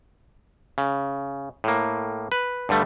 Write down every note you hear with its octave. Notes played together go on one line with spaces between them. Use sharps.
C#3
A2 A#3
B4
G2 D3 G3 A3